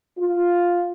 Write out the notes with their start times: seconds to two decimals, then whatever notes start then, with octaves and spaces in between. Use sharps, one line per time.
0.19 F4